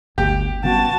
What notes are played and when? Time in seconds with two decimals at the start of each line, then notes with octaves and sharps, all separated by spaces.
0.18 G1 D2 G4 G5
0.64 C#3 G3 B3 F#4 A5